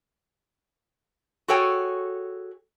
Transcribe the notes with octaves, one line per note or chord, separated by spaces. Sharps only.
F#4 G#4 A4 C#5 G5 G#5